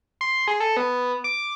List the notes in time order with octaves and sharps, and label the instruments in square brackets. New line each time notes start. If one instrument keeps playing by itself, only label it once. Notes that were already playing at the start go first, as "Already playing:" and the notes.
[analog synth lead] C6
G#4
A4
B3
D6